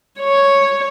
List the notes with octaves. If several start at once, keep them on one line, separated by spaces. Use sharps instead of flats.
C#5